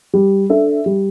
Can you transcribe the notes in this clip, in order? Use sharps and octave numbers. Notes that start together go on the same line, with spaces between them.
G3
D4 A4 E5
G3